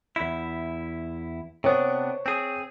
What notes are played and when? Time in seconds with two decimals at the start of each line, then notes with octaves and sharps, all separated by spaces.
0.16 E2 E4
1.64 C3 B3 D4 C5 C#5
2.26 C4 G#4